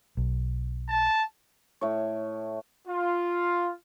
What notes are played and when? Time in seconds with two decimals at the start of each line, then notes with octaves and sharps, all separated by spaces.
0.17 B1
0.89 A5
1.81 A2 C#5
2.87 F4